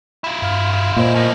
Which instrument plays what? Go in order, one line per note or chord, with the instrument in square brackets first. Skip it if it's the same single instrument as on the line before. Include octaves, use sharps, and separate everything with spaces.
[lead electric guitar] E4 F4
[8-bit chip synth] G2 F5 F6
[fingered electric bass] A#2 [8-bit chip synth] C5 D#5
[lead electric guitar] A2 A#3